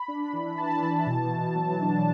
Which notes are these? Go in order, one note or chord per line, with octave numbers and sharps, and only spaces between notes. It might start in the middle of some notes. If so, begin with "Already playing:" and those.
Already playing: B5
D4
E3
E3 A5
E3
B2
B2
F#3
D4